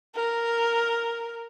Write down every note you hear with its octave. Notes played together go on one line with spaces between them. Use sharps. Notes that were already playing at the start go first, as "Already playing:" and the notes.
A#4